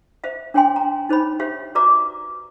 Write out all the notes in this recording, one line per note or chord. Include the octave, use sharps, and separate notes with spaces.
C5 E5 F5
D4 C#5 G5 G#5 C6
A#5
D#4 C5 C#5 B5
G4 C5 C#5 E5 F5
F#4 B4 D5 E5 A#5 D6